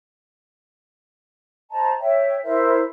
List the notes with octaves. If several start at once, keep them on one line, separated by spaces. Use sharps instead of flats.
C5 D#5 A5 A#5
C#5 E5 G5
E4 A#4 C5 E5